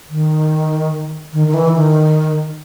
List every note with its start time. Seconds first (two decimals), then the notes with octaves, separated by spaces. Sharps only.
0.09 D#3
1.33 D#3
1.48 D#3
1.54 E3
1.75 D#3